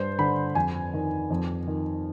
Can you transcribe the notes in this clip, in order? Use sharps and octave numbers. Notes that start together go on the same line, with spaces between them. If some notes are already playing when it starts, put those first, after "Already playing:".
Already playing: G2 C5
D3 B5
F2 G#5
D#3
F2
D#3